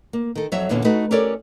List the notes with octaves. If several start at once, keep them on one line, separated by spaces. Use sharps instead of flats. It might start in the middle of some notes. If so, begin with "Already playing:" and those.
A#3
D#3 A4
F2 F#3 C#5 E5
E2 A#2 D3 B3 C#4
A3 D#4 F#4 B4
C#4 G4 A4 A#4 C#5 D5